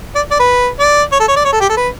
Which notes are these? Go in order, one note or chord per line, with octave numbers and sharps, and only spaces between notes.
D5
D5
B4
D5
C#5
A4
C#5
D5
C#5
A4
G4
A4
B4